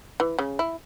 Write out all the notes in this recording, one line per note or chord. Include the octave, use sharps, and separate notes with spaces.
E3
C#3
E4